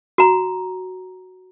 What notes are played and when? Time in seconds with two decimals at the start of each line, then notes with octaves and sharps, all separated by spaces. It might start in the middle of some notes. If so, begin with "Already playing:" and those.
0.18 F#4 A#5